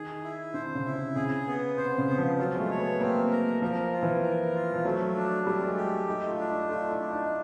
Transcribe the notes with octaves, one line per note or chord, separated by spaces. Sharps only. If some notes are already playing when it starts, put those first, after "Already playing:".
Already playing: D#3 G#4
E4
D3 C5
C#3
E4
C3
C#3 G#4
B3
C3 C5
C#3
B3
F3
F#3 F4
G#3
A3
C#5
B3
A#3 C4
A#4
F3 A#4
F4
E3
A#4
F4
F3
F#3 A3
D4
G3 A3
G#3
G4
A3 D#4
F4
D4
D#4
A3 F4
E4
D4
D#4